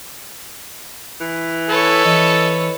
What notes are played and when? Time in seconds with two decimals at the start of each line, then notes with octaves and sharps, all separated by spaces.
1.20 E3
1.69 A4 B4 C#5
2.05 E3 D#5